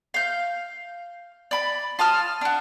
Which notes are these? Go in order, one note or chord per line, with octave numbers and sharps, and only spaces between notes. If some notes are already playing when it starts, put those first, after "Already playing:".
F5 G6
D5 B5
F4 A5 D#6 F6
D4 F#4